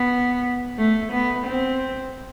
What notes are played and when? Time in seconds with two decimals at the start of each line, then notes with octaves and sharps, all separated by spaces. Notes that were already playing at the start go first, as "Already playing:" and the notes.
Already playing: B3
0.78 A3
1.12 B3
1.46 C4